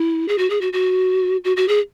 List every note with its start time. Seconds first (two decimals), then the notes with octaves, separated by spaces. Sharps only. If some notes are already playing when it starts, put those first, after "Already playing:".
Already playing: E4
0.28 G#4
0.38 F#4
0.50 G#4
0.61 F#4
0.73 F#4
1.44 F#4
1.57 F#4
1.68 G#4